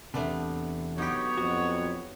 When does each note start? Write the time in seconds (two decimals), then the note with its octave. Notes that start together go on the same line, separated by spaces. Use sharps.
0.14 E2 C3 A3 B3 D4
0.98 F#3 B3 D#4 G4 C#5
1.38 F2 F#4